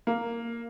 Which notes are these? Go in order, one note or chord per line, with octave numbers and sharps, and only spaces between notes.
A#3